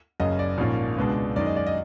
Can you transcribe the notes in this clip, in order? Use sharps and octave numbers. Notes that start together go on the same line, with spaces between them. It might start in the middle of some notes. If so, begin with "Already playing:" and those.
F#1 F#2 C#3 D#5
D5
A#1 G#2 F3 A#3 C#4
C#2 B2 G#3 B3 D4
F#2 D#3 G#3 D5
D#5
D5
D#5